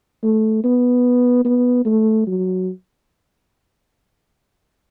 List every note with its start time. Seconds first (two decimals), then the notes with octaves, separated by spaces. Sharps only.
0.23 A3
0.64 B3
1.45 B3
1.85 A3
2.27 F#3